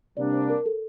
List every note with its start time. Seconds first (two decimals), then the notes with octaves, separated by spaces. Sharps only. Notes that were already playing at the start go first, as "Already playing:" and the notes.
0.17 C3 G3 A#3 D4 D5
0.33 C5
0.50 A#4
0.66 A4